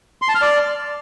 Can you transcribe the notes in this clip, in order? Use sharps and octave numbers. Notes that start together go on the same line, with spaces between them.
C6
A5
F6
D5